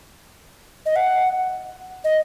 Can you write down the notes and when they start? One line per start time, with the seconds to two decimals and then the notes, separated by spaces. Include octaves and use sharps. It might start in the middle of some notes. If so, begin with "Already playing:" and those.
0.86 D#5
0.96 F#5
2.04 D#5